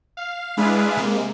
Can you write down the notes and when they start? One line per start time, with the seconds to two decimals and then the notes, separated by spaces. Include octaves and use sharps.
0.17 F5
0.57 G#3 D4 E4 G#4 B4 F5
0.97 C3 G#3 A#3